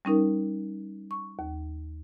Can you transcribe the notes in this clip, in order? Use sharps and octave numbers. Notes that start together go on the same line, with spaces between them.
G3 C#4 D#4 A#4
C#6
D#2